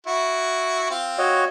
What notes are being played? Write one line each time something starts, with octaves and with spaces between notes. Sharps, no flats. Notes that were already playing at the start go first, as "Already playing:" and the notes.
E4 F#4
C4 F4
F#4 C#5 D#5